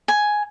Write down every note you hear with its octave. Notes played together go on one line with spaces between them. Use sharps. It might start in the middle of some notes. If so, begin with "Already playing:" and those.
G#5